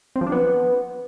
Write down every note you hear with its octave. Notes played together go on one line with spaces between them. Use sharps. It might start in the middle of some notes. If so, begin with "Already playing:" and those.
C4
F3
D4
B3